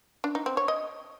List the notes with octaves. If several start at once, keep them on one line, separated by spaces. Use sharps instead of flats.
D4
D#4
C4
C#5
D#5